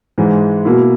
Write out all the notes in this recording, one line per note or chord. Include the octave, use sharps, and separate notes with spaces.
G#2 E3 G#3
B2 A#3 E4